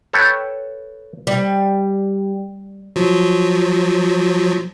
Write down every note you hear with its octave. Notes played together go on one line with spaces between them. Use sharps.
A4 B4 C#5 G5 A5
G3
F3 F#3